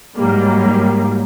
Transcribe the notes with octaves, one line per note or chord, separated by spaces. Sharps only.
G#2 F#3 G3 A#3